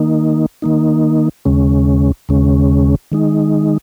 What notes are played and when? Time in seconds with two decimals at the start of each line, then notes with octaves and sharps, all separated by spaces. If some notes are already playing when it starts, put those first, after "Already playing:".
Already playing: D#3 A#3 D#4
0.62 D#3 A#3 D#4
1.45 D#2 C#3 G#3 C#4
2.29 D#2 C#3 G#3 C#4
3.12 D#3 G#3 D#4